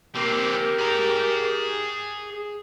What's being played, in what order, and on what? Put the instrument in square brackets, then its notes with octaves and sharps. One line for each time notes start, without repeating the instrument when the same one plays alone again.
[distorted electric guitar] A#3 C4 [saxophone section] G4 A#4
[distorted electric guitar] G#4 A#5